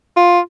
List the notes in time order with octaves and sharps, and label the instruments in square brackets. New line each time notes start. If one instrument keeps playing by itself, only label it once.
[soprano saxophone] F4